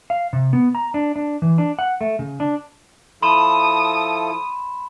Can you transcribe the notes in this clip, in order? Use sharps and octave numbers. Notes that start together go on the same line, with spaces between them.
F5
C3
B3
A#5
D4
D4
E3
D4
F#5
A3
C#3
D4
F3 E4 A4 B5 C6 D#6 E7